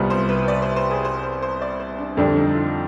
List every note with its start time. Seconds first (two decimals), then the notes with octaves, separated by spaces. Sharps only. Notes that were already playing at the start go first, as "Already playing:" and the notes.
Already playing: C2 C3 G3 B3 F4
0.10 C5
0.29 B4
0.48 D5
0.62 C5
0.76 C5
0.91 G#4
1.05 C5
1.23 C5
1.42 C5
1.62 D5
1.80 C5
1.98 D4
2.17 F2 D3 G3 C4 D4
2.37 D#4
2.55 F4